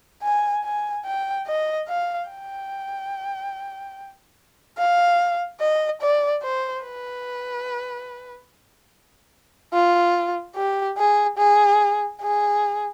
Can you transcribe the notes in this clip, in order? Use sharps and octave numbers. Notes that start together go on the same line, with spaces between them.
G#5
G#5
G5
D#5
F5
G5
F5
D#5
D5
C5
B4
F4
G4
G#4
G#4
G#4